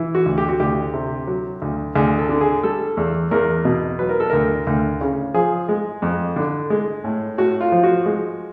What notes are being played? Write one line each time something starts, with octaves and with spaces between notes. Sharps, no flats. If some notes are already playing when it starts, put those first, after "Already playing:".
Already playing: E3
F#4
D2
G4
F#4
D2 G4
C3
F#3
D2
D2 G#4
A4
D3
G#4
G3 A4
E2
E2 A#4
B2
F#3 B4
A#4
A4
D2 A#4
D2
C#3
F3 G#4
G#3
F2
D3
G#3
A2
A2 F#4
F4
F3
F#4
G#3